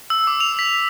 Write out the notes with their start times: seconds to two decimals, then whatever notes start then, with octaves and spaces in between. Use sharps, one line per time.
0.10 E6
0.27 D6
0.40 F7
0.59 B6